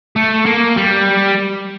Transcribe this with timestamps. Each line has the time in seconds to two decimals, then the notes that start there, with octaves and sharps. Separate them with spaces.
0.16 A3
0.46 A#3
0.77 G3